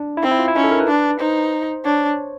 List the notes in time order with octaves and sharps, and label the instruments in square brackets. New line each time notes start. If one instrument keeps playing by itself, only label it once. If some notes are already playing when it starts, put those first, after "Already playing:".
Already playing: [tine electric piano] D4
E4
[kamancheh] C4 [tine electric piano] D#4
[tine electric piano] E4
F4
E4
[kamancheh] C#4 [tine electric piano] D#4
[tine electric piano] A4
A#4
B4
[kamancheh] D4
[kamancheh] D#4 [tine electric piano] C5
[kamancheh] D4 [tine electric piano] C#5